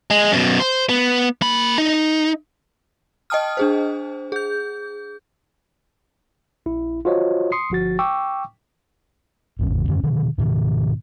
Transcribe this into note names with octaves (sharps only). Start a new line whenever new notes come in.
G#3
F#2 B2
C5
B3
A#3 B5
D#4
D#5 G5 A5 D#6 F6
D4 G#4 C5
G#4 G6
A#1 E4
F4 F#4 C5 C#5 D#5
C6 D#6 C7 C#7
G1 F3 F#4 A6
G5 C#6 D6 E6
G#1 E2 C#3
F#2 D3 D#3 C#4
B2 D3 D#3
G#2 B2 D#3